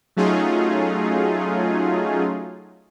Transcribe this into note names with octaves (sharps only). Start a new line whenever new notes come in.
F#3 A3 C#4 D#4 F4 G#4